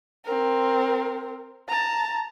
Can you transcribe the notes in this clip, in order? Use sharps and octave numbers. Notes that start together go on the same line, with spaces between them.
C4 A#4
A5 A#5